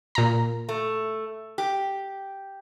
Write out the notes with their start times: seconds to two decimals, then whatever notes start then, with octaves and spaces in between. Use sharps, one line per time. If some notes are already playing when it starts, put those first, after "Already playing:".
0.15 A#2 A#5
0.69 A3
1.58 G4